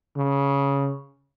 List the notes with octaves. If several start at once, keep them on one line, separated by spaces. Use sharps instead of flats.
C#3